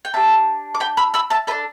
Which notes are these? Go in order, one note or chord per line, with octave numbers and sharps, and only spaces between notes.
G5
D4 G4 E5 A5
D6
G5 B5
B5 E6
B5 E6
E5 A5
D4 A4 B4 E5